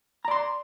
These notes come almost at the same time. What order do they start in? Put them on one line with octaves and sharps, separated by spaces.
A#5 D5 C6